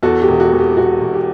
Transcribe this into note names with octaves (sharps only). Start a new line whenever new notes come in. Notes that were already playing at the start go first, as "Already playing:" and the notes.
E2 F#4 A4
G4
E1
F#4
E1
G4
E1 F#4
E1
G4